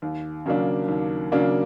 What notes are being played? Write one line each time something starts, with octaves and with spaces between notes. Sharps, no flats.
D#2
C#3 F#3 A#3 D4
D#2
C#3 F#3 A#3 D4